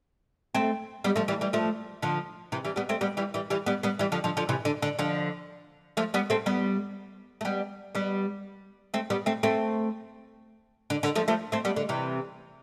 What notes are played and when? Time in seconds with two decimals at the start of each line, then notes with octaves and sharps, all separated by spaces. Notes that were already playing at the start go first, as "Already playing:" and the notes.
0.55 A3 C4
1.04 G3 B3
1.16 F3 A3
1.28 E3 G3
1.41 E3 G3
1.53 F3 A3
2.02 D3 F3
2.52 C3 E3
2.65 E3 G3
2.76 G3 B3
2.89 A3 C4
3.01 G3 B3
3.17 E3 G3
3.34 E3 G3
3.50 E3 G3
3.66 G3 B3
3.83 G3 B3
3.99 E3 G3
4.12 D3 F3
4.24 D3 F3
4.37 D3 F3
4.49 C3 E3
4.65 D3
4.82 D3
4.99 D3 F3
5.97 F3 A3
6.14 G3 B3
6.30 A3 C4
6.46 G3 B3
7.41 A3
7.45 G3 B3
7.95 G3 B3
8.94 A3 C4
9.10 G3 B3
9.26 A3 C4
9.43 A3 C4
10.90 D3
11.03 D3
11.15 F3 A3
11.28 F3 A3
11.52 A3 C4
11.65 G3 B3
11.76 D3
11.89 C3 E3